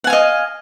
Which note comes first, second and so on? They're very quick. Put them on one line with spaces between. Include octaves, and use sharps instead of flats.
F#5 G#5 F5 D#5